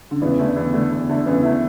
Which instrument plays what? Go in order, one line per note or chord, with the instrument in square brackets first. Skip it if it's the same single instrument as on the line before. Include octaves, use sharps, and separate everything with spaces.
[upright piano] D3
[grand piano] E2 [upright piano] C#3 E3
[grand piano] D3 A3 E4
E2
D3 A3 E4
E2
D3 A3 E4
[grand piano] E2 [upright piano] C#3 E3
[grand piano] D3 A3 E4